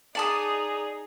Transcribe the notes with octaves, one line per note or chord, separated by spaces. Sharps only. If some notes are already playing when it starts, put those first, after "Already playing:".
D#4 G#4 D5 A5 D#6